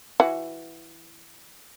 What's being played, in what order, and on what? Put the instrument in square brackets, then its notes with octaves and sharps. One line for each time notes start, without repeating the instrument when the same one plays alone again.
[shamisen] E3 F#4